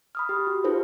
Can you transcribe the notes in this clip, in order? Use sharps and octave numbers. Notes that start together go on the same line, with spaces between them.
B5 D#6 F6
G4
F#4
D#4 F4 G4 A4 B4 C5